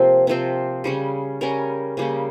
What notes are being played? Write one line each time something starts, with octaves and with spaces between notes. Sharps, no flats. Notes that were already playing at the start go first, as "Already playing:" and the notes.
Already playing: C3 F3 A#3 C4
C3 F3 C4
C#3 G3 C#4
C#3 G3 C#4 A#4
C#3 G3 A#3 C#4